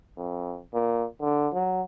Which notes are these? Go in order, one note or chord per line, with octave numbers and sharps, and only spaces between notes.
F2
A#2
D3
F#3